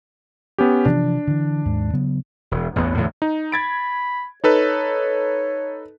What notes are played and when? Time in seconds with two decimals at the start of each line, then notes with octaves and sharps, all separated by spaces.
0.58 B3 C#4 G4
0.86 C3 E3 F3 D4
1.27 D3 E3
1.65 D#2 G#2 G#3
1.94 C#3 F#3 B3
2.51 E1
2.76 A1 E2 G2 B3
2.97 E2 A2 D3
3.22 D#4
3.52 B5 G#6 A6 D7
4.44 D#4 A4 B4 C#5